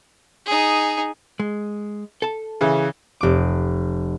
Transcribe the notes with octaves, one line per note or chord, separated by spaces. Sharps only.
D#4 G#4
G#3
A4 A5
C#3 E3
F1 D6